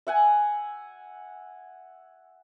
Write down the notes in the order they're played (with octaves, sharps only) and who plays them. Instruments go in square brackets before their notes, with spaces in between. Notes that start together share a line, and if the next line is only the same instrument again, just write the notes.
[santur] E5 F#5 G#5